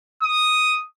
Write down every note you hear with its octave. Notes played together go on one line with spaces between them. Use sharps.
D#6